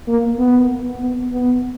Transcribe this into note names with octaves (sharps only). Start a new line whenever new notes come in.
A#3
B3
B3
B3